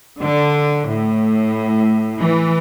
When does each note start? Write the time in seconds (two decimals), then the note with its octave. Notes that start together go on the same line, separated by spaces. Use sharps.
0.21 D3
0.86 A2
2.18 E3